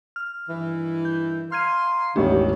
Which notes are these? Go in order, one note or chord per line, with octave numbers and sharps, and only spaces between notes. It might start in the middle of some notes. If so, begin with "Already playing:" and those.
F6
G2 D#3 E3
G6
F5 A#5 C6 F6 G#6 D#7
E1 A1 C3 D#3 D4 G4 C#5